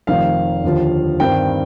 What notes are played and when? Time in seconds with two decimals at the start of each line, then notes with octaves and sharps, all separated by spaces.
0.07 F1 F2 D#3 F5
0.64 D#2 D3 F3
1.20 G2 D#3 G3 C4 G5